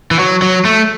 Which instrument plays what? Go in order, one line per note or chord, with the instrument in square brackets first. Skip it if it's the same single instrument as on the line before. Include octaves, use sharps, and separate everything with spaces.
[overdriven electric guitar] E3
F#3
F#3
A3